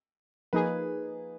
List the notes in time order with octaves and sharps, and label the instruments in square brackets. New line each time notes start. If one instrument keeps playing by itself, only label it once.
[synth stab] F3 A#3 D#4 G#4 [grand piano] B4